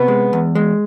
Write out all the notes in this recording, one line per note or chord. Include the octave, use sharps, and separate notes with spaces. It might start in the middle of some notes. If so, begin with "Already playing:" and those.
Already playing: C3 B3 B4
G#3
E2
G#3